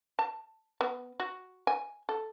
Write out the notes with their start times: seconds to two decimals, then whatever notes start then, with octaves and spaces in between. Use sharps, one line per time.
0.19 A5
0.81 B3
1.20 F#4
1.67 G#5
2.09 A4